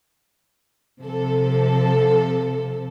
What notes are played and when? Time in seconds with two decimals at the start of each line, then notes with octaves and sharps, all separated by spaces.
1.01 C3 F3 A4